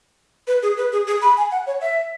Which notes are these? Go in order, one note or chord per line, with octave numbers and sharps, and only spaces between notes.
B4
G#4
B4
G#4
G#4
B5
G#5
F#5
C#5
E5